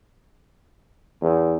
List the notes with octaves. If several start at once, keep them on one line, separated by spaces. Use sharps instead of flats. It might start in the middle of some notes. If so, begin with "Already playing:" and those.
E2